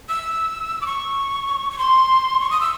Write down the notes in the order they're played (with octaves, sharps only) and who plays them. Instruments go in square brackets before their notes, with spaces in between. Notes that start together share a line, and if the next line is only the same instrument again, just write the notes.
[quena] E6
D6
C#6
C#6
C6
C#6
D#6
E6